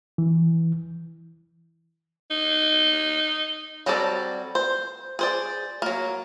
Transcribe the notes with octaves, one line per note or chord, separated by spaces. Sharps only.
E3
D#4
F#3 G3 C4 A4 D5
C5
G#4 C5 D5
F#3 A#3